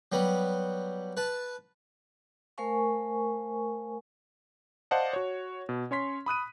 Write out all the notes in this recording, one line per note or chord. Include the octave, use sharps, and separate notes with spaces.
F#3 G3 B3
B4 A5
A3 A#4 C5 F5 G#5 C#6
C5 D5 D#5 F5 F#5 A5
F#4 C#5
B2
C#4 C#5 C6 B6
B5 D#6 F#6 D#7